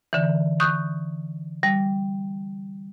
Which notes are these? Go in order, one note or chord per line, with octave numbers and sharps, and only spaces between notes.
D3 E3
C#6 D#6 F#6 G6
G3